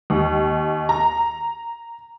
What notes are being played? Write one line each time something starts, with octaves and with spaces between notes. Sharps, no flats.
D#2
A#5